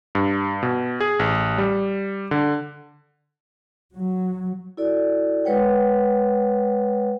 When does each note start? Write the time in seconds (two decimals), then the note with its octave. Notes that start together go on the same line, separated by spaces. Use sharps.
0.15 G2
0.63 B2
1.00 G#4
1.19 A1
1.58 G3
2.31 D3
3.95 F#3
4.77 E4 F#4 A4 D5
5.45 G#3 B4 C#5 F#5 G5